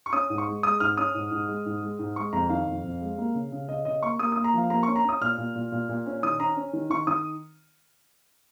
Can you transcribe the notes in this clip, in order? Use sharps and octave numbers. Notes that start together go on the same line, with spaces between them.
C#6
C#4 D#6
G#2
C#6
G#3
G#3 D#6
G#2 F6
C#4 D#6
G#2
G#2
G#3
G#2
G#3
G#2
G#3 C#6
F2 A#5
D#3 F5
F2
F2
G#3
A#3
C#3
C#3
C#3 D#5
C#3 D#5
A#3 C#6
A#3 D#6
A#3 D#6
A#5
F3 F5
A#3 A#5
C#4 C#6
A#5
C#4 D#6
A#2 F6
A#2
A#2
A#2
A#2
C#4
D#3 D#6
C#4 A#5
C#4
D#3
D#3 C#6
D#3 D#6